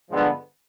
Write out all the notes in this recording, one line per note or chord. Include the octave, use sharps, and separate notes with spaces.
G2 D3 F3 G#3 B3